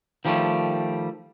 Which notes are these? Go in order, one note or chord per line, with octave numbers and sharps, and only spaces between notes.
D#3 F3 G3 A3